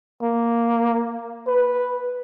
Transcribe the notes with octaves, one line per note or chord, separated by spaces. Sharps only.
A#3
B4